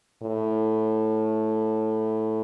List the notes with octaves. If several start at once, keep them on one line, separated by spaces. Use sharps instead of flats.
A2